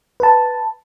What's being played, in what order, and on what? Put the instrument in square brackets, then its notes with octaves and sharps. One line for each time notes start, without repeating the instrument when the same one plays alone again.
[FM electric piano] B4 A5